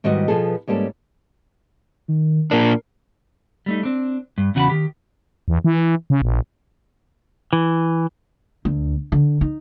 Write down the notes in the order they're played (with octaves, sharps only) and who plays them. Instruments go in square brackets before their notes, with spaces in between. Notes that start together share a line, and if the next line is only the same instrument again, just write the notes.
[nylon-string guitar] G#2 D#3 G3 B3 F#4 D#5
B2 F3 B3 G#4 A4
G#2 G3 A#3 C#4 A4
[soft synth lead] D#3
[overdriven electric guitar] A#2 D4 [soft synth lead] A#4
[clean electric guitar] G3 A3 D#4
C4 D4
G2
E2 C#3 F#4 G#5 A5 B5
D#3 G4
[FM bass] E2
E3
C#3
A#1
[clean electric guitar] E3
[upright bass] D2
D3
D#4